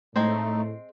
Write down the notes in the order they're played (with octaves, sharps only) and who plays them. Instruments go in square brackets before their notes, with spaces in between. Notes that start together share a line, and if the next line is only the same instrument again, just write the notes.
[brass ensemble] A2 [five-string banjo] G#3 C4 C5 [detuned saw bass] A3 [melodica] D#4